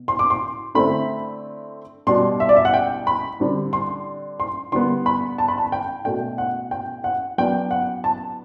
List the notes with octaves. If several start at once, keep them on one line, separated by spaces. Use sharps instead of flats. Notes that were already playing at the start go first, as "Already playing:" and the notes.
Already playing: B2
C6
D6
C6
D3 A3 C4 E4 B5
B2 G3 D4 C6
E5
D5
E5
F#5
G5
B5
D3 G3 C4
C6
C6
D3 G3 B3 C6
B5
A5
B5
A5
G5
B2 A3 D4 G5
F#5
G5
F#5
F#3 B3 D4 G5
F#5
A5